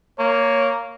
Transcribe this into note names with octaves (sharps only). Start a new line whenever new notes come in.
A#3 C#5